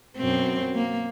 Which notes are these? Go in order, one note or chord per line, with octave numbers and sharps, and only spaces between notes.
F#2 B2 C4
A#3